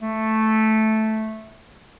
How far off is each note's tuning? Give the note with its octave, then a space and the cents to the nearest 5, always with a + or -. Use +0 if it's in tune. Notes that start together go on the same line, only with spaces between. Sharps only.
A3 -5